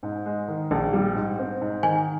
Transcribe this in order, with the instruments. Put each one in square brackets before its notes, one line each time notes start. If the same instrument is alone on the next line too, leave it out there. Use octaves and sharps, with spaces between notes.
[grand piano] G#2
G#3
D#3
A#1
G3
G#2
C4
G#2
[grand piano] D#3 [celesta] G#5